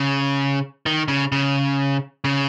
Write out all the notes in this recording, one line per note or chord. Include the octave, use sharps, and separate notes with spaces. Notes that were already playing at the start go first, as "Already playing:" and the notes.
Already playing: C#3
D#3
C#3
C#3
C#3